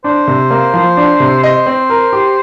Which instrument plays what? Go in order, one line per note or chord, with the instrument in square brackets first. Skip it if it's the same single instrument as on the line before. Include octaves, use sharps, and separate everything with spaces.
[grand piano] D4 [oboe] C5
[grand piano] C3
A#3
F3
D4
C3
[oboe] C5 [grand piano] D#5
[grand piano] C4
A#4
G4